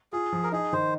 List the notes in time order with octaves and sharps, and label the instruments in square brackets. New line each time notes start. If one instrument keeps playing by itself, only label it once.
[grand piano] F4 [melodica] G#4
[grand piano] F3
[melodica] A#4
[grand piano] D#4 [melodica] G#4
[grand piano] D#3 [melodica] C5